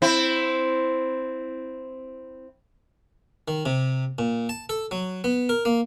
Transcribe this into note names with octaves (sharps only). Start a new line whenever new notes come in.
C4 E4
D#3
C3
A#2
A5
A4
F#3
B3
A#4
A#3